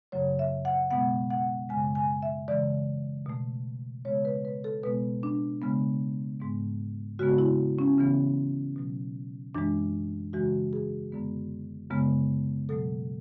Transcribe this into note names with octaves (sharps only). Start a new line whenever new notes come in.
F#2 C#3 F#3 A3 C#5
E5
F#5
B2 G#3 B3 F#5
F#5
F#2 C#3 G#3 G#5
G#5
E5
C#3 E3 G#3 D5
B2 A3
C#3 G#3 B3 C#5
B4
B4
A4
B2 G#3 B3 B4
D4
C#3 G#3 B3
G#2 G#3 B3
C#3 G#3 B3 F#4
E4
C#4
C#3 E3 B3
B2 F#3 A3
F#2 E3 G#3 D4
E2 C#3 E3 G#3 F#4
G#4
F#2 D3 G#3 B3
F#2 C#3 G#3 B3
B2 F#3 A3 A4